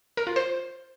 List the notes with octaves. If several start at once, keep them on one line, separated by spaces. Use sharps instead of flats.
A#4
F4
C5